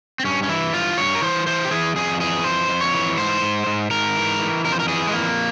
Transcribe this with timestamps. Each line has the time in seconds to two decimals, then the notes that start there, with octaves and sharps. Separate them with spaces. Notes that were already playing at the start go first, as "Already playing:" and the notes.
0.20 C4
0.24 G2 C#4
0.43 C#4
0.49 E3 E4
0.73 G2 F4
0.98 G2 C#5
1.15 A#4
1.22 E3 C5
1.47 E3 C5
1.65 G4
1.71 E3 G#4
1.96 F2 G#4
2.20 E3 G#4
2.44 F2 C5
2.69 F2
2.81 C#5
2.94 E3
3.18 G#2 C5
3.42 G#2
3.66 G#2
3.90 G#2 A#4
4.16 E3
4.39 E3
4.65 F2 A#4
4.72 C5
4.80 A#4
4.88 E3 G#4
5.07 G#3
5.13 F2 A#3